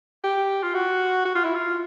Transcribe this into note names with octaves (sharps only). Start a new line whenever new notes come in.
G4
F4
F#4
F#4
F4
E4
F4